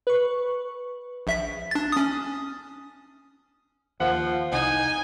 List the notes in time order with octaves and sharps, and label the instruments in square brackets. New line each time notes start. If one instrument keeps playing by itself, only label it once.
[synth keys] B4 C#6
[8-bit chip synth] A#1 E5 B6
D4 A6
C#4 D#6
[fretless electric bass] D#2 [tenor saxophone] F3 [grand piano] F#5
[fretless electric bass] C2 [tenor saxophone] D#4 [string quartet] G#5